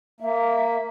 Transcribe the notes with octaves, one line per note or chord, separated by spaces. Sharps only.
A#3 E5